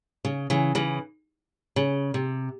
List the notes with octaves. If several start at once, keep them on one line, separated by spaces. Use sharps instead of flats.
C#3
C#3 E3
C#3 E3
C#3
C3